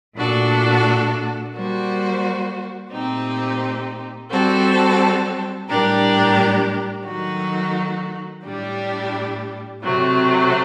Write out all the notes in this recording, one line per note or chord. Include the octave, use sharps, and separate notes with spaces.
A#2 A3 D4 F#4 A4
G3 A#3 F#4 C5
A#2 A3 C4 D#4 G4
G3 C4 F#4 A4
A2 G3 D4 G4 A#4
D#3 F#3 A3 D#4 F#4
A2 G3 D4 G4
C3 F#3 A3 C4